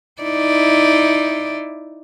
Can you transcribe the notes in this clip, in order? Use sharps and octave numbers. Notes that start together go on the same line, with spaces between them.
D#4 E4 D5